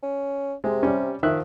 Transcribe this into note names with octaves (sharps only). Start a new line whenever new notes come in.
C#4
C3 G#3
G3 C#4
D#3 F3 E5 F#6